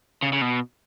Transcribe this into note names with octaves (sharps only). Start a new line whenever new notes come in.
C#3
C#3
B2